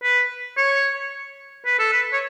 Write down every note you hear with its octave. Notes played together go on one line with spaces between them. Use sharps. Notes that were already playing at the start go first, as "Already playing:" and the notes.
B4
C#5
B4
A4
B4
C#5